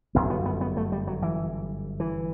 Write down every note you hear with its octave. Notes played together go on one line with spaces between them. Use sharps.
G1 F#2 B3
B3
B3
B3
A3
G3
F#3
E3
E3